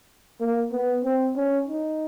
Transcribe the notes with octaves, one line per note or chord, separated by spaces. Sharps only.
A#3
B3
C4
C#4
D#4